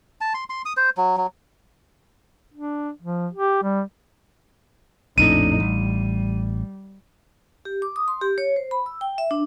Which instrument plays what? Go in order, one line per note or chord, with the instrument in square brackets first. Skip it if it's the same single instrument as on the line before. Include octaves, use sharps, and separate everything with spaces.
[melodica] A5
C6
C6
D#6
C5
F#3
F#3
[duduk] D4
F3
G4
G3
[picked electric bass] A#1 F2 A2 [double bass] D4 D#4 [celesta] D#7
[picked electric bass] A1 [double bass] G3
[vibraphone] G4
D6
D#6
C6
G4
C#5
C5
B5
E6
G5
E5
D4